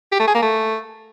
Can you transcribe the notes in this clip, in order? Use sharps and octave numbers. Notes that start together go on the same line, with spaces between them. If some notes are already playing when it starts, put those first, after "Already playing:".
G4
A3
G#4
A#3
A3